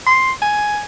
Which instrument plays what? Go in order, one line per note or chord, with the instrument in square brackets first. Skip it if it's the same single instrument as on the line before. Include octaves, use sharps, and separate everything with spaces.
[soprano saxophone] C6
G#5